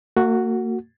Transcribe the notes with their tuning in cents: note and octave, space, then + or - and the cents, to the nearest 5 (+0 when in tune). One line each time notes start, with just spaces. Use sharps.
A#3 -40 F#4 +0